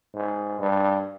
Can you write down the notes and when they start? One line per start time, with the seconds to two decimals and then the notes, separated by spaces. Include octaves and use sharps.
0.14 G#2
0.59 G2